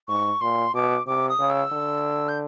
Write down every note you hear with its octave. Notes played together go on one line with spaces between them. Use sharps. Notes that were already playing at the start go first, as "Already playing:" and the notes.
G#2 C#6
A#2 C6
B2 D6
C3 D6
D#6
C#3
E6
D3
G6